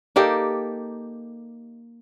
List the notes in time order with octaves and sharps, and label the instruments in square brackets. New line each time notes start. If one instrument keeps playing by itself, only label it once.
[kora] A#3 D#4 G4 A4